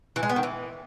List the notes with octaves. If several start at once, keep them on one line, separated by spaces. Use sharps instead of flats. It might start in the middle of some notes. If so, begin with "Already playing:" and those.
E3
G#3
B3
D#3
E3